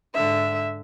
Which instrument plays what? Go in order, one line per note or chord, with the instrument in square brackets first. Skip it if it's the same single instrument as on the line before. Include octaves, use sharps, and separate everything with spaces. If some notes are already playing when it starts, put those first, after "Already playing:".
[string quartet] G#2 D3 [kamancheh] E5